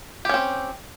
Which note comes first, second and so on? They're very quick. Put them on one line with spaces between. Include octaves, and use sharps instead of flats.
G4 C#4 C4